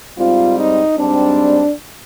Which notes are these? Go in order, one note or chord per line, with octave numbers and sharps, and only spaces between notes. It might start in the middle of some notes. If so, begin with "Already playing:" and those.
G#2 G3 C4 F4
D#4
G#2 G3 C4 D4